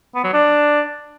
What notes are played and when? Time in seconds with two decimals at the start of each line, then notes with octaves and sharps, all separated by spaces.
0.15 B3
0.24 F#3
0.34 D4